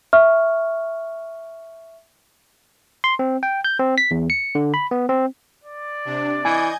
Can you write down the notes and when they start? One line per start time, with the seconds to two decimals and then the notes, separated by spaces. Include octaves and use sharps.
0.13 E5 C#6 F6
3.04 C6
3.19 C4
3.43 G5
3.65 G6
3.79 C4
3.98 B6
4.11 E2
4.30 C#7
4.55 D3
4.74 B5
4.91 B3
5.09 C4
5.64 D5
6.05 C3 D4
6.45 E3 D#5 G#5 G6 G#6